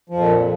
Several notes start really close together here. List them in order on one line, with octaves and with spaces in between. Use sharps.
F3 F2 A#2